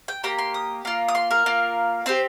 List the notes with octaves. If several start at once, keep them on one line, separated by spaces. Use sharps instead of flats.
G5
A#3 G4 A#5
C6
D#6
A#3 F4
D#6
C6
A#4
A#3 F4
C4 G4 C5